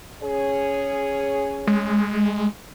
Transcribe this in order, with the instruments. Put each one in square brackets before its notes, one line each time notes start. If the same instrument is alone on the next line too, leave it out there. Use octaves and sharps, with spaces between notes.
[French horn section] C#4 G#4 C#5
[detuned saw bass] G#3